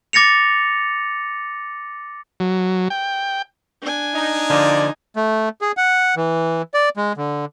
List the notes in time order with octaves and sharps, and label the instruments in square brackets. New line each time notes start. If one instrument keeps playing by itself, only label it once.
[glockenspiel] D6 A6 A#6 C#7 F7
[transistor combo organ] F#3
G5
[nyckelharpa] D4 G#5
[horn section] D#4
[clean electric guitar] D3 F3 A#3 [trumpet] D5
[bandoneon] A3
G#4
F#5
E3
D5
G#3
D3